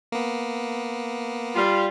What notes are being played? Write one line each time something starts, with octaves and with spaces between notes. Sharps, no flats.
A#3 B3
G3 F4